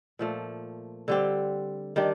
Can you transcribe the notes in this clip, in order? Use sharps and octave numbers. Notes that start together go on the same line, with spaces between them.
A#2 F3 A3
D3 G3 C4 G4
D#3 G3 D4 G4